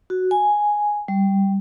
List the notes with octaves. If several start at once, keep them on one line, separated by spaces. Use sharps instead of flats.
F#4
G#5
G3